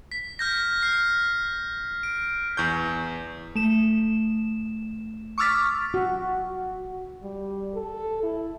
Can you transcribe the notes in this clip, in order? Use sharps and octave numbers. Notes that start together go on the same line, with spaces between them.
B6
F6 G6 A#6
F6 C7
D7
E2 C#6 G6
A3 E7
C#6 D6 E6 F6 A6 B6
F#4
G3
A4
E4